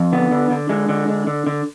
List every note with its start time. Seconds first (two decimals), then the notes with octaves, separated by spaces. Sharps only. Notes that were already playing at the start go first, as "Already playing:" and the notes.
Already playing: F2
0.12 D3 B3
0.31 D3
0.50 D3
0.69 D3 G#3
0.89 D3
1.08 D3
1.27 D3
1.47 D3